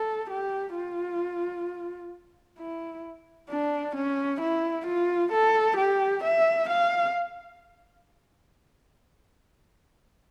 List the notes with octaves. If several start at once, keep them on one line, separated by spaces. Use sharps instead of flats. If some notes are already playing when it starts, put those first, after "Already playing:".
Already playing: A4
G4
F4
E4
D4
C#4
E4
F4
A4
G4
E5
F5